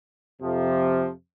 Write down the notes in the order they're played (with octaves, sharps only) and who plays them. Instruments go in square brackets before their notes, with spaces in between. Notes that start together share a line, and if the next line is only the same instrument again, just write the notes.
[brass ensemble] F2 C3 F3